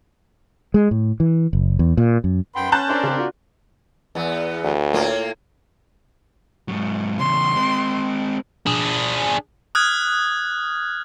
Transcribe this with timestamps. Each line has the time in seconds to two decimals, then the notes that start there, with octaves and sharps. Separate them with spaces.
0.74 G#3
0.91 A2
1.20 E3
1.53 F#1
1.79 E2
1.97 A#2
2.24 F#2
2.56 F#2 B4 F#5 G5 C6
2.72 C#4 A5 F#6 G6
2.89 D4 A#4 C5 D5 C6
3.03 C#3 C4
3.16 D4 F4 F#4
4.15 E2 B3
4.64 D2
4.93 A2 A#3 F4
6.68 G#2 F#3
7.19 E2 C#3 C6
7.55 G#3 C4
8.66 D4 G#4
9.75 D#6 F6 F#6 G#6